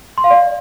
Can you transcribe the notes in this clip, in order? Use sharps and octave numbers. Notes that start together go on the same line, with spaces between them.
C6
F5
D5